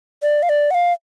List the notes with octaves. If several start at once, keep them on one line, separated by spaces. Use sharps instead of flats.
D5
F5
D5
F#5
F5